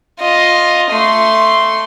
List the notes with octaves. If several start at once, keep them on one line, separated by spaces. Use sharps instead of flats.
F4 D#5
A3 C6